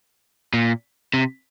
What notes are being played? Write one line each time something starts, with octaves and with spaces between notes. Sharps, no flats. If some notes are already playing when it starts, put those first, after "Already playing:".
A#2
C3